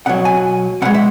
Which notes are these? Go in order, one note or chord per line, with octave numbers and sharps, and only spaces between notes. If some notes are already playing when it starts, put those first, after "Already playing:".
B2 F#3 F#5
G#5
B2 G#3 F#5
E5